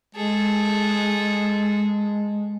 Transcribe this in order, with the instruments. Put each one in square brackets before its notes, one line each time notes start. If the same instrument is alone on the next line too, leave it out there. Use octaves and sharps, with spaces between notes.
[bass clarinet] G#3 [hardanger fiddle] G#4 A4